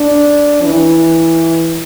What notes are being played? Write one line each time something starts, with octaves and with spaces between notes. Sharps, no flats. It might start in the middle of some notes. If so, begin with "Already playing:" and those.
Already playing: D4
E3